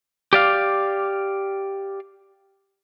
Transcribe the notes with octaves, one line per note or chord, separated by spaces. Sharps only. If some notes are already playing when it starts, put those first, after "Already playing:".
G4 D5 F5